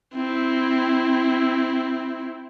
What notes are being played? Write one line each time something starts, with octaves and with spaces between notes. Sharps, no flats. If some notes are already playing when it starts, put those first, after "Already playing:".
C4 E4